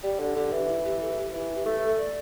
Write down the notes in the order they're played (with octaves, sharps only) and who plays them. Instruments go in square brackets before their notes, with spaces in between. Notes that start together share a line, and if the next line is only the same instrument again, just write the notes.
[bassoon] G3 [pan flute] G4
[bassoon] D3
[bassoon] D3 [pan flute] G4
[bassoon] E3
[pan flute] E4
G4
A4
G4
[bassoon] E3 [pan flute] E4
[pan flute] G4
[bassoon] A3
[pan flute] A4
D5